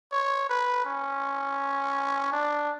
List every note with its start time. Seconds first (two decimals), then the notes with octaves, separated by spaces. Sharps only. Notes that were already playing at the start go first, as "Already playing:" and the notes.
0.12 C#5
0.49 B4
0.85 C#4
2.32 D4